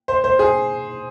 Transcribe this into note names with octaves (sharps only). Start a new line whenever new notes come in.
C5
C5
G#4